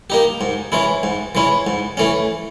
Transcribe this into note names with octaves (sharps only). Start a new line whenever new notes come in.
A#3 D#4 G4
G#2
E3 G#3 C#4 E4
G#2
E3 G#3 C#4 E4
G#2
E3 A3 C#4